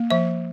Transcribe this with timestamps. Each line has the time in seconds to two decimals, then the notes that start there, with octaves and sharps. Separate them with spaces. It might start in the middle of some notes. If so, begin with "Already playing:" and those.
Already playing: A#3
0.10 F3 E5